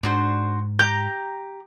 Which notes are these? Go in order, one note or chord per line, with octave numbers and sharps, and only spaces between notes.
G#2 D4 F#4 C5
G4 A#5 G6